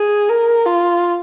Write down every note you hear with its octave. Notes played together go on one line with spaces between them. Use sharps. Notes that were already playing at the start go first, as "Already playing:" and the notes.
Already playing: G#4
A#4
F4